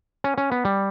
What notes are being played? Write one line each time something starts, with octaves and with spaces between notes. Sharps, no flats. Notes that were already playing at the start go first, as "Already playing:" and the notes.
C#4
C#4
B3
G3